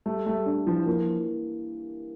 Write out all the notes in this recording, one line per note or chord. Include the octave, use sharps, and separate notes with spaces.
G3 A3
G3 A3
D4
E3 F3
F3 A#3